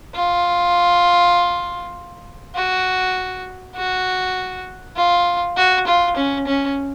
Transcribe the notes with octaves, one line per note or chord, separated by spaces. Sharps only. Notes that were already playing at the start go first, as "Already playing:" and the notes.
F4
F#4
F#4
F4
F#4
F4
C#4
C#4